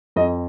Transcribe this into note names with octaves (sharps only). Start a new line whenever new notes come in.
F2 D#5